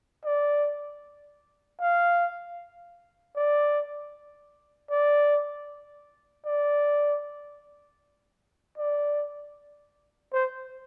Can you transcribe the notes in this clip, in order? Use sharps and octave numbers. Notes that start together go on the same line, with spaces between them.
D5
F5
D5
D5
D5
D5
C5